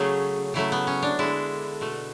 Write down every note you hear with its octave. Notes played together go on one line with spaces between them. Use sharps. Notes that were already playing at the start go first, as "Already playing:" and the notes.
Already playing: C#3 F#3 A3 G#4
C#3 F#3 A3 E4
B3
C#4
D4
D3 G#3 E4
B2 A3